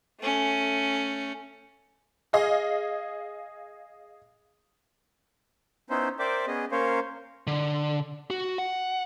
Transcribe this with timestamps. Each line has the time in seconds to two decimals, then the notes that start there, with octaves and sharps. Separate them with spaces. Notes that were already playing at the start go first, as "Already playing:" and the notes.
0.20 A3 C#4
2.33 G#4 D#5 F5
5.90 B3 C#4 D#4 E4 C5
6.19 A#4 C5 D5 E5 G5 D6
6.47 B3 C#4 G#4 D#5
6.72 A#3 C#4 A#4 C5 C#5 F5
7.47 D3
8.30 F#4
8.58 F#5